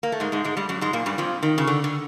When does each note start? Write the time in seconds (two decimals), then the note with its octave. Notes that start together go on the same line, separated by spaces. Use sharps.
0.03 A#3
0.12 A3
0.20 G#2 G#3
0.32 G#2 G#3
0.44 G#2 G#3
0.57 G2 G3
0.69 F#2 F#3
0.81 G#2 G#3
0.93 A#2 A#3
1.06 G2 G3
1.18 F2 F3
1.43 D#3
1.58 C#3
1.67 D3
1.84 D3